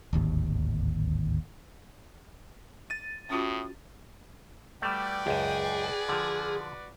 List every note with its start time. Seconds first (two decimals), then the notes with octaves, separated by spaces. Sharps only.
0.13 D1 G#1 D#2
2.90 A6 D#7
3.30 A2 C#4 F4 F#4 D#6
4.82 G3 A3 F#4 B4 D5 G5
5.27 C#2 F#2 G#4
6.09 D3 F3